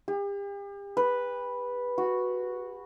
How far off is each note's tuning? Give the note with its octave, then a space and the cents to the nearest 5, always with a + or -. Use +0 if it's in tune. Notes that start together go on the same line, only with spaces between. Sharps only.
G4 +40
B4 -5
F#4 -5